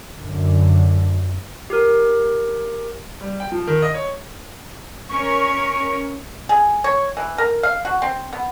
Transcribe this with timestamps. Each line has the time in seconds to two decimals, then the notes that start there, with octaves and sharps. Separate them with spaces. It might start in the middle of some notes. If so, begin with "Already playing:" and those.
0.17 F#2 D3
1.70 G4 A#4
3.21 G3
3.40 G5
3.52 F3
3.67 D#3
3.82 D#5
3.94 C#5
5.09 C#4 A#4 C#5 C#6
6.49 G#4
6.84 C#5
7.17 E3
7.38 A#4
7.63 F5
7.85 F#4
8.02 C4
8.33 B3